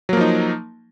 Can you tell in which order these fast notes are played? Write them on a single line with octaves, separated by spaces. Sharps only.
F#3 A#3 F3 D#4